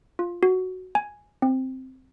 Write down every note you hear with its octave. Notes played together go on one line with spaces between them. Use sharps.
F4
F#4
G#5
C4